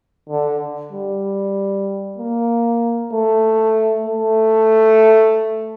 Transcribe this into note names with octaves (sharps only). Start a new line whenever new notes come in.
D3
G3
A#3
A3
A3